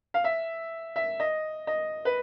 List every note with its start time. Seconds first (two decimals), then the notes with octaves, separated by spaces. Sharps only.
0.14 F5
0.24 E5
0.96 E5
1.20 D#5
1.67 D#5
2.05 B4